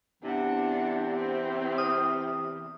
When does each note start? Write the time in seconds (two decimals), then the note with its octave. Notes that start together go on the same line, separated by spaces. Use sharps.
0.23 E2 C3 D4 F#5
1.18 C4
1.78 D#6 F6